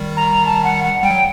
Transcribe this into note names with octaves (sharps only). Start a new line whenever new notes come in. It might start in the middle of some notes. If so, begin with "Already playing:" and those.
Already playing: D#3 G3
A#5
A5
F#5
F#5
G3 G5
F#3